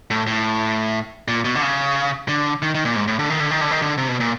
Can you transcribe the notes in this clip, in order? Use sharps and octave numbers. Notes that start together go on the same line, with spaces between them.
A2
A2
A#2
B2
D3
C#3
D3
D#3
D#3
A#2
G#2
A2
D3
D#3
D3
D#3
D3
D#3
D3
C3
B2
A#2